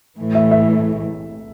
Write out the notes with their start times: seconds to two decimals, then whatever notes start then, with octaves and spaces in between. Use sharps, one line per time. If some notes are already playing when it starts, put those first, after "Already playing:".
0.19 A2 E3 A3
0.35 E5
0.51 E5